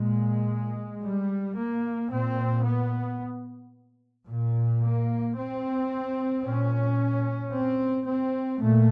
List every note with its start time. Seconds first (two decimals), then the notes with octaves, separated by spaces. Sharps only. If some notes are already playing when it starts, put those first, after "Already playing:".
Already playing: A#2 G#3
1.02 G3
1.56 A#3
2.10 A#2 C4
2.64 B3
4.27 A#2
4.81 A#3
5.35 C4
6.44 A#2 C#4
7.53 C4
8.07 C4
8.61 A#2 A3